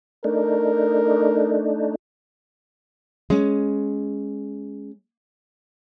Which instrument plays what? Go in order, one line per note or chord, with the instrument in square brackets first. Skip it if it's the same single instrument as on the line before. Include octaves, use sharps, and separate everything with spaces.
[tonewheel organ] A3 D4 D#4 [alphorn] A#4
[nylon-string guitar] G#3 C#4